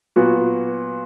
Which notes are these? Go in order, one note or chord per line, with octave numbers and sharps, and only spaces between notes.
A#2 F#3 B3 F#4